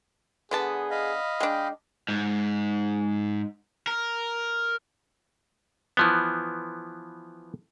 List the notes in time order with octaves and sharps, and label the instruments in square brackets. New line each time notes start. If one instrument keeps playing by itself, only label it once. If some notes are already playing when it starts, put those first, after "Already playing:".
[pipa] D3 B3 A5 [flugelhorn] G#4
[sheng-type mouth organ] D#5 F5 B5
[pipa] G#3 D4 [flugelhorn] G5
[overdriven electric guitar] G#2
A#4
[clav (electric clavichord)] E3 F3 B3